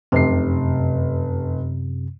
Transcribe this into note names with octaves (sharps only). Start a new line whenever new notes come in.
F1 F#2 C3 C7